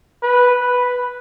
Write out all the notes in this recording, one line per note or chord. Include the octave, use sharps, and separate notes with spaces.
B4
B4